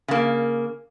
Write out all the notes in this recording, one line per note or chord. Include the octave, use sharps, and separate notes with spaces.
C#3 A#3